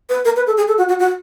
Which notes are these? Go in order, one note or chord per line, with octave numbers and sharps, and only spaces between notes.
B4
A#4
B4
A4
G#4
A4
F#4
F#4
F#4